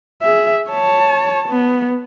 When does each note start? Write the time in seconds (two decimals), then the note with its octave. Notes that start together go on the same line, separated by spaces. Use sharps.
0.22 G#4 E5
0.70 C#5 A5
1.48 B3